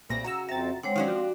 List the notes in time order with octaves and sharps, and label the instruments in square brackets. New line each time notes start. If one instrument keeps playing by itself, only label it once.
[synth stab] B1 A#2 A#6 [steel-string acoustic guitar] G3 A3 C4
[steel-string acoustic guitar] C#3 F#4 [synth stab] A#5 E6
[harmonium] F2 C4 [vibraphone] E5 [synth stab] A#5 A6
[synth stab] D3 [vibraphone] G#3 C#5 F#5 [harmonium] C4
[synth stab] D#3 F#3 C#4 [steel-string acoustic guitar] D4 F#4 G4 [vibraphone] F5
[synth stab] F3